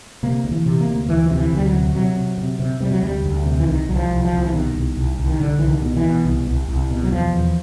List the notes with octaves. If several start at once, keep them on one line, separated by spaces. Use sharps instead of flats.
C3 A#3
D2
E3
C3
A#3
D2
D2 E3
C3 F3
E3
D2 G3
F#3
C3
C3 F#3
C3
C3
C3
C3 G3
F#3
D2 G3
D2
C3
E3
C2 D#3
C2 F#3
F3
C2
F3
C2
E3
B2 D#3
C2
C2
C2
D#3
C2 D3
C2 E3
D#3
B2
E3
B2
C2
C2
C2
B2
F#3
E2 F3
E2